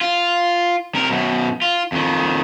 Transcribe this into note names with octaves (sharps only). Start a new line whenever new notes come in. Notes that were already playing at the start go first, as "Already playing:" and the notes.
F4
C3 A#4
F#2 B2
F4
F2 D#3